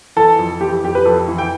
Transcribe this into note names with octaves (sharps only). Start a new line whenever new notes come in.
E3 A4
F2
E3 G4
F2 G4
B4
F2 A4
E3
G5